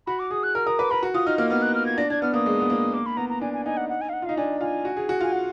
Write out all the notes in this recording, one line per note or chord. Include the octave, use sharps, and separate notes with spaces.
F#4 B5
D6
G#4 D#6
F#6
A#4 F6
A#4 D#6
B4 D6
A#4 B5
F#4
F4 D#6
D#4 F6
A#3 F6
B3 F6
F#6
F6
G#6
D4 A#6
D4 G#6
B3 F6
A#3 D#6
G#3
B3
A#3
A#3 D6
B5
B3 A#5
A#5
D4 G#5
G#5
D#4 G#5
F#5
F#5
G#5
F5
F#5
F4
D#4 F5
D4 G#5
F4 G#5
F#4
G#4
F#4
F4 G#5
F#5